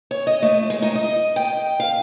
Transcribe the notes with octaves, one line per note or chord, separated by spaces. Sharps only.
C#5
D#5
A3
G#3
D#4
D#5
G5
F5